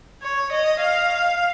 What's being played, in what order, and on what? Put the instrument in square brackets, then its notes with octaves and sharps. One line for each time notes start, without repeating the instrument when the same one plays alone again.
[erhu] C#5
D#5
F5